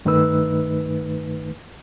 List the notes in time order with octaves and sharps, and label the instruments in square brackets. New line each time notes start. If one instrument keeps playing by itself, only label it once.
[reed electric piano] G2 D#3 A3 D#4 B4 E6